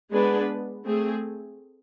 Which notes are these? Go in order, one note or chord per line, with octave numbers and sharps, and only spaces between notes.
G#3 B3 D4 G#4 B4
A3 C4 G#4